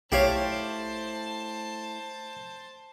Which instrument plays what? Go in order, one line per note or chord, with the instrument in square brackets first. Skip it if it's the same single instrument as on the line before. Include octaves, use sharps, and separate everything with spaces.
[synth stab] B1 C#5 [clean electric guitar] A3 E4 [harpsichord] G4 F5 [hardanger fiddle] C5 A5